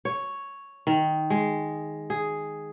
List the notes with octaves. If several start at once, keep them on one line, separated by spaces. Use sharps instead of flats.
C#5
D#3
G#3
G#4